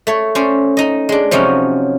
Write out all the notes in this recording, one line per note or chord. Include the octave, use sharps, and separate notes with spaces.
A3 C#5
C#4 C5 D5
D#4 D#5
G#3 D4
C3 F3 F#3 C#4 D#4